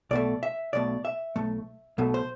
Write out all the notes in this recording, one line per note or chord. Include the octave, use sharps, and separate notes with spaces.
B1 B2 A3 D5
E5
B1 B2 A3 D5
E5
B1 B2 A3
B1 B2 A3
C5